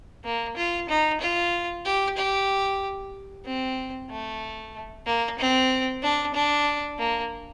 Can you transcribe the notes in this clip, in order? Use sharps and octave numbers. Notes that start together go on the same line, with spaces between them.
A#3
F4
D#4
F4
G4
G4
C4
A3
A#3
C4
D4
D4
A#3